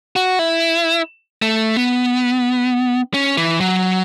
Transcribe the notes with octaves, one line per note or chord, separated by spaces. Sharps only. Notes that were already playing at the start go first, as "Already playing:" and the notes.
F#4
E4
A3
B3
C#4
E3
F#3